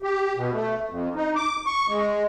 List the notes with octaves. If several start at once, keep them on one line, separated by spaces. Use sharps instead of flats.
G4
B2
A3
F2
D#4
D6
C#6
G#3